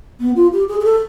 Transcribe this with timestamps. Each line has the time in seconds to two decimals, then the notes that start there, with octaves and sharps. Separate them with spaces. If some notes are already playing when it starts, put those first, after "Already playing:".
0.20 B3
0.36 F4
0.53 G4
0.68 G#4
0.80 G#4
0.84 A4